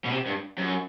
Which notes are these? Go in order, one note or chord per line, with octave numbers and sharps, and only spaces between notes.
B2
C3
G2
F#2